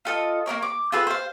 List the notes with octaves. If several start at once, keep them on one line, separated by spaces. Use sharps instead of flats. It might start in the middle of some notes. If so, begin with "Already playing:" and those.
F4 A4 D#5
A#3 D4 A#4 C#5
D6
F4 G#4 A4 B4
C5 F5